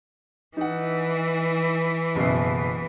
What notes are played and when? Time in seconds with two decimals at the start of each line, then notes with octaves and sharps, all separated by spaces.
0.57 E3 D#4 F#5
2.15 F#1 B2 C7